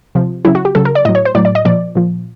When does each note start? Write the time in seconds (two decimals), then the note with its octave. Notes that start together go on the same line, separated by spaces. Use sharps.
0.15 C3 F3
0.45 C#3 F#3 E4
0.55 F#4
0.65 G4
0.75 C#3 F#3 A4
0.85 A#4
0.95 D5
1.05 A2 D#5
1.09 F#3
1.15 C#5
1.25 C5
1.35 A2 F#3 D5
1.45 D5
1.55 D#5
1.65 A#2 F3 D5
1.95 A#2 F3